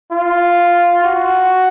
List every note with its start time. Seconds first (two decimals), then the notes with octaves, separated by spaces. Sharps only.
0.12 F4
1.04 F#4